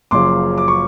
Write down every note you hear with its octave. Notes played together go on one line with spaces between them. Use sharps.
F#1 F#2 C#3 F3 C6 D6
D6
C#6